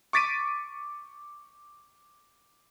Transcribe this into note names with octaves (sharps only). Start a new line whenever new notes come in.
C#6 D6 A6 B6 D7 D#7